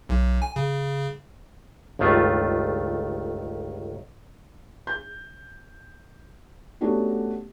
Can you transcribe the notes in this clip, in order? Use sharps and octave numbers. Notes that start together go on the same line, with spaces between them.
B1
G#5
C#3
G1 C#2 D#3 A3 F4
G6
A3 B3 C#4 D4 F#4 G4